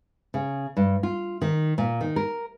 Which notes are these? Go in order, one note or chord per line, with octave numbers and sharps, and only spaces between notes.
C#3
G2
F4
D#3
A#2
D#3
A#4